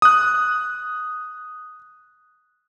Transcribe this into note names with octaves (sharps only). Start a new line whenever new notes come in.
D#6 F#6